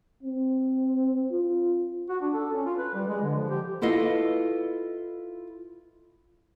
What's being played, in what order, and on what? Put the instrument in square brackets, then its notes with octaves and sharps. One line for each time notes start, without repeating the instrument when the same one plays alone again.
[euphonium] C4
F4
[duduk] F#4
D4
A4
C#4
F4
B4
G3
G#3
D3
F3
G4
[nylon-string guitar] E4 F4 A4 B4 D#5 F5